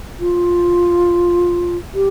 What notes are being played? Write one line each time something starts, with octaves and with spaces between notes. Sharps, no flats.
F4
G4